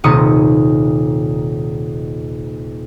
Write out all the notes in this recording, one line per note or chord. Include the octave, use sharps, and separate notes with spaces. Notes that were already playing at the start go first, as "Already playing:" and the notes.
D#1 C3 C4 D#4 D#6 C#7